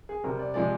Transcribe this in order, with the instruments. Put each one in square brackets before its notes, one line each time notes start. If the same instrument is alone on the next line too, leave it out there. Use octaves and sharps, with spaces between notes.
[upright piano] G#4
C3 G3 A#4
D5
C3 F3 G#3 D5